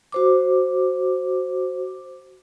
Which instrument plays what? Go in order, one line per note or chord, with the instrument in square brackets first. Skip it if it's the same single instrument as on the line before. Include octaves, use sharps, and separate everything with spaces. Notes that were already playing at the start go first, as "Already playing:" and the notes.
[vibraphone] F#4 C5 D6